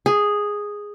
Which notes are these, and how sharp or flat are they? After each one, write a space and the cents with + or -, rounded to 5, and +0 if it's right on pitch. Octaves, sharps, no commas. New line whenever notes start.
G#4 -5